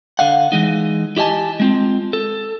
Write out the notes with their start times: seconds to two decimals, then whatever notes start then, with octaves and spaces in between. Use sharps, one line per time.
0.19 D3 F5 F#5
0.52 E3 F3 G#3 D#4
1.17 E4 G4 D#5 G#5 A5
1.60 G#3 C4 F4
2.13 A4